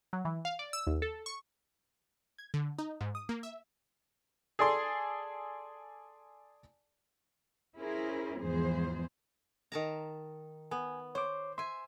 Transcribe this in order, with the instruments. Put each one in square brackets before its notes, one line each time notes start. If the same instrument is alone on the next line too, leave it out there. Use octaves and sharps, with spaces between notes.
[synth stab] F#3
E3
F5
D5
E6
D#2
A4
C#6
[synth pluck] G#6
D3
D#4
G#2
D#6
A#3
E5
[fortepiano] G#4 A4 D5 A5 C6
[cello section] C#4 E4 G#4 A#4 C5
E2 G#2 E3 F3 G#4 C5
[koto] D#3 A5 A#5
[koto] B3 [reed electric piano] G#5
[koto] C5 [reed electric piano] C#5 D6
[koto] E5 G#5 [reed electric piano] C6